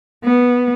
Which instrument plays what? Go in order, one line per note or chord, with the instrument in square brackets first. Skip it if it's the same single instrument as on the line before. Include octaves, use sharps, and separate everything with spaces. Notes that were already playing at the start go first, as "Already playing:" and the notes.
[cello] B3